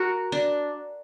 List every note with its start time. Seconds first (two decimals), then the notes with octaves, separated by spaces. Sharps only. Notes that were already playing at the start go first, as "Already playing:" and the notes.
Already playing: F#4 A#4
0.32 D4